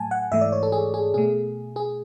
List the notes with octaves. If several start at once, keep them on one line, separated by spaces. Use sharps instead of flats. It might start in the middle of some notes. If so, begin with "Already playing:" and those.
Already playing: A2 F#3 A3 G#5 A5
F#5
G#2 E3 A3 E5
D5
C#5
A4
G#4
G#4
B2 A3 G#4
G#4